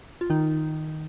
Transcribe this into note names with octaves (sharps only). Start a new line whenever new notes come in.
F4
D#3 D#4